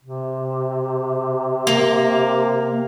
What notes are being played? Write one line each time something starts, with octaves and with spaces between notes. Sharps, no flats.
C3
A#3 A#4